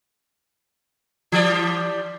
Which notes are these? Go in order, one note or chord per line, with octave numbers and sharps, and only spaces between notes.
E3 G3 D5